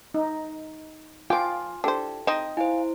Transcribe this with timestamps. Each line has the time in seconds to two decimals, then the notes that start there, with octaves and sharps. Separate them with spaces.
0.14 D#4
1.30 F3 F4 G5 G#5 D6
1.84 D4 E4 G4 A4 C5
2.27 C4 D#4 D#5
2.57 E4 C5 F5 G#5